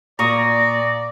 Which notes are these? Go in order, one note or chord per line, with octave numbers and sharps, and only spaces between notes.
A#2 D5 A#5 C#6 D#6 A#6